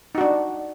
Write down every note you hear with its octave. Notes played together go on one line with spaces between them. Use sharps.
D4 D#4 F#4